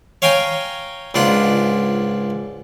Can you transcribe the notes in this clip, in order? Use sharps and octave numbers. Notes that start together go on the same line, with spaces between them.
C#5 F5 G5 G#5 A#5
C#2 G#2 D4 F4 F#5